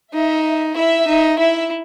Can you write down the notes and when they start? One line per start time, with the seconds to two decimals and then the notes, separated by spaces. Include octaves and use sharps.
0.13 D#4 E5
0.77 E4 E5
1.08 D#4
1.39 E4 E5